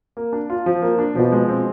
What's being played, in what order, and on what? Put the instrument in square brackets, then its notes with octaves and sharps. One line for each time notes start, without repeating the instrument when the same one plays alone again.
[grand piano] A#3
D4
F4
F3
A#3
D4
[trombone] B2 [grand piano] F3
[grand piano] G#3
C4